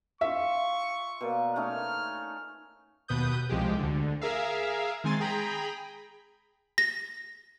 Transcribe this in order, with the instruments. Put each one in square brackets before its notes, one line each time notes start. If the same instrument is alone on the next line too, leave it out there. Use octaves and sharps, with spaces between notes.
[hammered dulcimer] F4 [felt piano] E5 [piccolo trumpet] C#6
[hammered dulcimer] B2 A#3 D5
[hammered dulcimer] A3 C#4 D#4 [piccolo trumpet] F6
[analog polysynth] D#2 B2 B4 D#6 G6
C2 F3 G#3 G4
D2 D3
G#4 A#4 E5 F5
D#3 G#3 C4 G#5 C6 A6
G#4 G5 A#5 B5
[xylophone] A#6